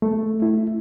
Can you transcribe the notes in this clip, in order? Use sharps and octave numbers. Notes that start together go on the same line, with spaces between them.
A3
E4